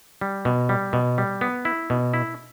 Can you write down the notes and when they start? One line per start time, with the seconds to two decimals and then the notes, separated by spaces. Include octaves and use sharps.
0.21 G3
0.45 B2
0.69 G3
0.93 B2
1.18 G3
1.41 B3
1.65 E4
1.90 B2
2.14 E4